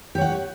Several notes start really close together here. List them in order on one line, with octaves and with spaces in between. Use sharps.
G4 C#5 F#5